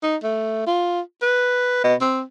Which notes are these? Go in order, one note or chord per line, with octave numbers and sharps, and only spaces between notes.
D#4
A3
F4
B4
B2
C4